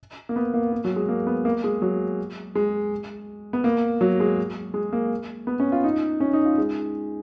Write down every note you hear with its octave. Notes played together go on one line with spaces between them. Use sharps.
A#3
B3
A#3
A#3
F#3
G#3
A#3
B3
A#3
G#3
F#3
G#3
B3
A#3
F#3
G#3
G#3
A#3
B3
C#4
F4
D#4
C#4
D#4
F4
G#3